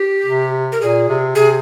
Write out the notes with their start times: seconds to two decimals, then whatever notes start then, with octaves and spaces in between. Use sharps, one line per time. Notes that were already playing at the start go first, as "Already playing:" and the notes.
Already playing: G4
0.25 C3
0.72 A#4
0.81 A#2 G#4
1.08 C3
1.35 C3 G#4